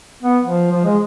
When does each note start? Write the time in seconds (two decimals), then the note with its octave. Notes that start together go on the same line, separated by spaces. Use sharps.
0.23 B3
0.44 F3
0.72 F3
0.85 G#3